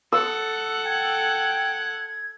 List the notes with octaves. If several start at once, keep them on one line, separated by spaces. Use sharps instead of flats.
A4 F#5 E6
G5 G#6